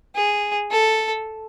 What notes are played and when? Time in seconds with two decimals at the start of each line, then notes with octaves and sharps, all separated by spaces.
0.16 G#4
0.71 A4